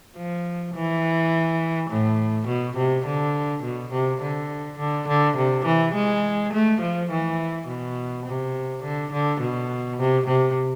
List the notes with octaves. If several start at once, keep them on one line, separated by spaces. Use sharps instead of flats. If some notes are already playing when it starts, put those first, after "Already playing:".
F3
E3
A2
B2
C3
D3
B2
C3
D3
D3
D3
C3
E3
G#3
A3
F3
E3
B2
C3
D3
D3
B2
C3
C3